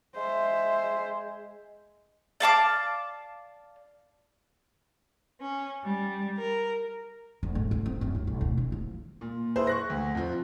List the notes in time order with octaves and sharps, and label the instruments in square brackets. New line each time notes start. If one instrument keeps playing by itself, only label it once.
[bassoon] G#3 [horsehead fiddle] C5 E5
[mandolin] D5 F5 A5 D6
[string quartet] C#4
G3
A#4
[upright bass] D2
G#2
D2
C4
F#2
C#2
B1
D2
D3
F3
[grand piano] A#2
E4 G#4 B4 C5
C#6 F#6 A#6
D2
F2 F3